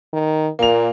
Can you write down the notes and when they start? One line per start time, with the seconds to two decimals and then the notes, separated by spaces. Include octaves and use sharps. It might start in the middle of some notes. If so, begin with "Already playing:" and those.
0.13 D#3
0.59 A#2 A#3 F7